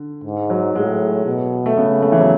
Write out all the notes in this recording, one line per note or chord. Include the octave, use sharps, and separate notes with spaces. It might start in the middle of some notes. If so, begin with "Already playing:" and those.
Already playing: D3
G#2
F#3
A2 G#3
B2
A3
C#3 B3
A3
E3
F#3